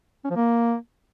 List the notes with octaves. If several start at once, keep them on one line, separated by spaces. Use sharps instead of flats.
C#4
F3
A#3